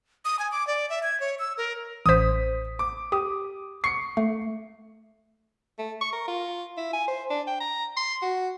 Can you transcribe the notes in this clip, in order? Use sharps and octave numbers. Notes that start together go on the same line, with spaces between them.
D#6
G#5
D6
D5
E5
G#6
C#5
E6
A#4
A1 C5 D#6 B6
D6
G4 D#6
C#6 C7 C#7
A3
A3
C#6
A#4
F4
E4
G#5
C5
D4
G5
A#5
C6
F#4